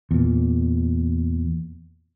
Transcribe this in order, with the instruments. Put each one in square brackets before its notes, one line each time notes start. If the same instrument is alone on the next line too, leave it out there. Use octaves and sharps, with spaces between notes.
[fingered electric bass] E2 A#2